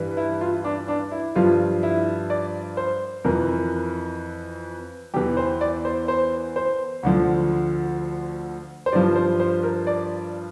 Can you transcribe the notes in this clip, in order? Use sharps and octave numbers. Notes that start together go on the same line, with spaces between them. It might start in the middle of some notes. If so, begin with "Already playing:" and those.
Already playing: G2 E3
E4
F4
D4
D4
E4
G2 F3 F4
E4
D5
C5
F2 E3 A#4
E2 E3 G4
C5
D5
C5
C5
C5
D2 D3 F3
C5
G2 F3 D5
C5
C5
A#4
D5